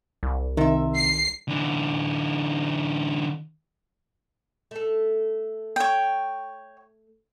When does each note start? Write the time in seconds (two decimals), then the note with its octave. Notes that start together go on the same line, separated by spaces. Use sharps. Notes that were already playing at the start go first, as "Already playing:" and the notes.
0.23 C2
0.57 C3 D#3 E5
0.96 C7
1.48 D3 E3
4.71 A3 A4
5.76 C#5 G5